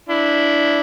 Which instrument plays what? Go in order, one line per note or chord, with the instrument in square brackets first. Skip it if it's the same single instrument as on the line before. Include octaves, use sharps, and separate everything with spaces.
[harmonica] D4 E4